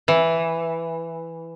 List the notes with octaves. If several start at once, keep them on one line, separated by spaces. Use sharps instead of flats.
E3